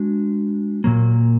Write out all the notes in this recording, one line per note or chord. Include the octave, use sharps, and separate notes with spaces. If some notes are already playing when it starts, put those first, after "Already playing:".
Already playing: G#3 D4 F#4
A#2 F#3 A#3